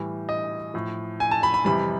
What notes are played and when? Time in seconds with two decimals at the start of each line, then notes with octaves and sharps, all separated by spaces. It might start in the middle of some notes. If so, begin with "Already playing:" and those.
Already playing: A2 E3 G3
0.29 D#5
0.74 A2 F3
1.20 G#5
1.31 A5
1.43 B5
1.54 B5
1.65 F2 C3 E3 G3 B5